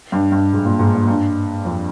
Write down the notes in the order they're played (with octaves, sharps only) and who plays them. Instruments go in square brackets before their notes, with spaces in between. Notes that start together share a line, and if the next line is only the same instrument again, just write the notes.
[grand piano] G2
G2
G#2
A#2
G#2
A#2
G2
F2